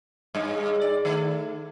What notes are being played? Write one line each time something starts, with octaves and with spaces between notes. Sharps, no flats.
G2 G#3
D5
D#3 A3